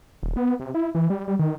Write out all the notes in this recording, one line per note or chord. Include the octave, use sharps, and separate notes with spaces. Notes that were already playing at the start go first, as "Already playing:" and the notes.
D#1
B3
C3
E4
E3
G3
G3
D#3